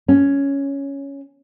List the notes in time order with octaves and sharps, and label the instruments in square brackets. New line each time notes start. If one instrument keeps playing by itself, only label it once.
[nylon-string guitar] C#4